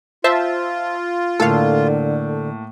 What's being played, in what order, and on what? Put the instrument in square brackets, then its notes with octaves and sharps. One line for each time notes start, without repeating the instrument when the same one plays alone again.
[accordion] F4 [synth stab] C5 E5 A5
[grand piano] A2 A#3 [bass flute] D3 [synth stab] A4 F5